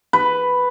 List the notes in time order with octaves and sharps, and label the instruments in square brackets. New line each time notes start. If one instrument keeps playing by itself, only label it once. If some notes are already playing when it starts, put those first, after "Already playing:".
[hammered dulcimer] B4